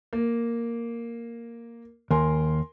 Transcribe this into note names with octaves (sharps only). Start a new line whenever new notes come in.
A#3
D#2 A#4 G#5 C6